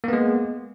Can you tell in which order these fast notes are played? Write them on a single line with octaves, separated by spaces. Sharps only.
A#3 B3 G#3